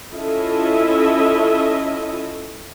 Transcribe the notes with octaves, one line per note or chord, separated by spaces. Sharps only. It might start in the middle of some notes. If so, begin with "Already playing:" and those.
C#4 E4 F4 A4 D#5 E5